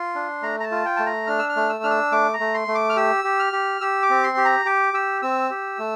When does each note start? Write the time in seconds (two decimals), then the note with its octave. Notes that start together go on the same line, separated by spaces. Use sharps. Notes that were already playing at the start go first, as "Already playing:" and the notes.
Already playing: F4 C6
0.15 D4
0.42 A3 A#5
0.60 A#5
0.63 A5
0.71 F4
0.85 G5
0.96 A3 A5
1.06 A#5
1.27 D4 F6
1.39 E6
1.49 F6
1.56 A3
1.69 E6
1.84 D4 F6
1.91 E6
2.12 A3 D6
2.34 A#5
2.40 A3
2.54 C6
2.68 A3
2.75 D6
2.90 F6
2.96 G4 E6
3.24 G4
3.39 F6
3.53 G4
3.81 G4 E6
4.03 D6
4.10 C4
4.24 C6
4.37 G4
4.45 A#5
4.65 G4 D6
4.93 G4 E6
5.22 C4 E6
5.50 G4
5.79 A3